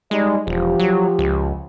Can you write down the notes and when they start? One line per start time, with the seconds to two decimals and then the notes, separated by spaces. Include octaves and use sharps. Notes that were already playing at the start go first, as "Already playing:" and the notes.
0.11 G3 G#3 D#4 D#5
0.47 E1 F3 G4
0.79 F#3
1.19 C#2